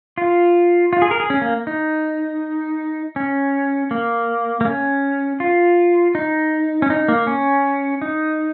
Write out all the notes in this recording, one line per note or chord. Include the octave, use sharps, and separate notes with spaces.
F4
F4
G#4
A#4
G#4
C#4
A#3
D#4
C#4
A#3
A#3
C#4
F4
D#4
C#4
D#4
A#3
C#4
D#4